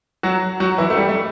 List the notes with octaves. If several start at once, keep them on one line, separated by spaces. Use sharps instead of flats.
F#3 F#4
F#3 F#4
E3 E4
A3
G3
A3